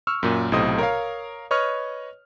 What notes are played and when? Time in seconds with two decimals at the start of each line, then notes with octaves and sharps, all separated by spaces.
0.07 C#6 E6 F6
0.23 F#2 A#2
0.52 B1 A2 C3 C5 D#5 D#6
0.78 A#4 C#5 F5
1.51 B4 C#5 D#5 C#6 F6